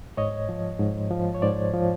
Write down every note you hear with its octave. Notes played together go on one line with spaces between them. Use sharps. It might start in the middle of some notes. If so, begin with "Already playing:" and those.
G#2 C#5 D#5
F3
G#2
F3
C#5
G#2 C5 D5
F3